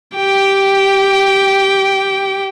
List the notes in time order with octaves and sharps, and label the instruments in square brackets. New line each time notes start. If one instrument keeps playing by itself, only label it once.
[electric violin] G4 G5